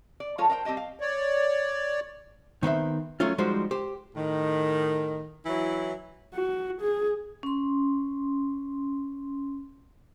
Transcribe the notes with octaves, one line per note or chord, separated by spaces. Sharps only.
D5
F3 G#3 F4 A4 C#5
A#4 C5 D#5 G5
G3 C4 G4 D#5 A5
F5
C#5 D5
D#3 B3 C4 E5
F#3 A3 C#4 F4
F3 G3 G#3 D#4 F#4 C5
G4 C5
A2 D#3
E3 F#3 E4
F#4
G#4
C#4 C6